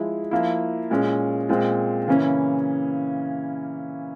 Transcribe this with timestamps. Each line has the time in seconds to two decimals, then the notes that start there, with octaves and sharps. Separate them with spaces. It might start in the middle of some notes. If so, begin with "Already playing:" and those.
Already playing: F3 G#3 E4
0.31 F3 A#3 E4
0.90 A#2 G#3 C#4
1.49 A#2 G#3 C4
2.08 C#3 E3 A#3 C#4 E4